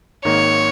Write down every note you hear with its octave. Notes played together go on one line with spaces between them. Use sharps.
G#1 G#2 D#3 A#3 D#4 C#5